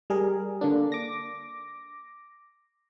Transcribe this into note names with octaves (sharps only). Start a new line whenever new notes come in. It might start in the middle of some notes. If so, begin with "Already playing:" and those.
G3 G#4 A#4
D3 A#3 D4
D6 A#6